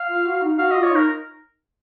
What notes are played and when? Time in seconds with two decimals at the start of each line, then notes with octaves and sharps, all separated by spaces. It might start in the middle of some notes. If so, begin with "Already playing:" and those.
Already playing: F5
0.09 F4
0.26 F#4
0.42 D#4
0.58 F#4 F5
0.71 F4 D#5
0.83 C#5
0.91 D#4 A#4